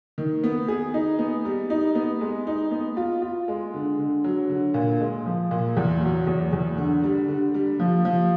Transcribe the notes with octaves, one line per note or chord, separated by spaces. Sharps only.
D#3
B3
G#4
D#4
B3
G3
D#4
B3
G#3
D#4
B3
F4
F4
G#3
D3
D3
F#3
D3
A#2
G#3
F3
A#2
E2
F#3
E2
E2
D3
G3
D3
G3
F3
F3